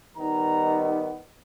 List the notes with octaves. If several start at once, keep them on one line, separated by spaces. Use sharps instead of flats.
D#3 G3 B3 D#4 A#5